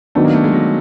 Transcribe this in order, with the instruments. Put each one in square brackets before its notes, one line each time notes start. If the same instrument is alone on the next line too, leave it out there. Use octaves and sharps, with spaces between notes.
[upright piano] D#3 F#3 B3 D4 [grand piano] A3
[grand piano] A#3
A3
G#3
F#3